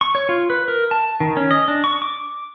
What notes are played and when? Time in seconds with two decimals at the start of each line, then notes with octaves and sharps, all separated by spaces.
0.01 C#6
0.15 C#5
0.29 F4
0.50 B4
0.68 A#4
0.91 A5
1.20 D#3
1.37 C#4
1.51 D#5
1.68 D4
1.84 C#6
2.02 D6